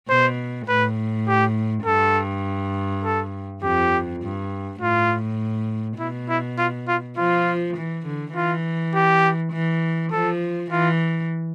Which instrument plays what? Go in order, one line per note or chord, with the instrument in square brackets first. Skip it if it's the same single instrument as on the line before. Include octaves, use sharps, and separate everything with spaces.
[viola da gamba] B2 [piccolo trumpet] C5
[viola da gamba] A2 [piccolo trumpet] B4
[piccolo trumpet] G4
[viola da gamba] G2 [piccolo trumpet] A4
[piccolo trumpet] A4
[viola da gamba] F2 [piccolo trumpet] G4
[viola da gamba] G2
[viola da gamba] A2 [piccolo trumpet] F4
[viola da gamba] B2 [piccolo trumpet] E4
[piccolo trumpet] E4
F4
F4
[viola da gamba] F3 [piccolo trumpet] F4
[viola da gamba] E3
D3
[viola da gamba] E3 [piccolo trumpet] F4
[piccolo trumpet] G4
[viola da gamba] E3
[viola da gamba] F3 [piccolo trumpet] A4
[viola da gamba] E3 [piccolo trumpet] F4